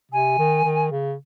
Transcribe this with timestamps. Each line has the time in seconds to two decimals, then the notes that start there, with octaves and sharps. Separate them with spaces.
0.11 C3 G#5
0.38 D#3
0.64 D#3
0.91 C#3